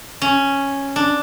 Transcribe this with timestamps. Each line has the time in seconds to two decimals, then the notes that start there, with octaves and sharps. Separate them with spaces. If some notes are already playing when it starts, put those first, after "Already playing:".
0.22 C#4
0.96 D4